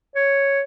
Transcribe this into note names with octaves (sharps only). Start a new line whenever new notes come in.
C#5